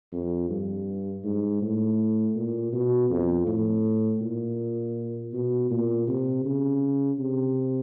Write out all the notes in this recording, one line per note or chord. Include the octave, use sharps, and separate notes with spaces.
F2
G2
G#2
A2
A#2
B2
F2
A2
A#2
B2
A#2
C3
C#3
C3